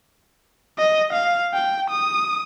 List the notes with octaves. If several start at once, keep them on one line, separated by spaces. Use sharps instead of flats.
D#5
F5
G5
D#6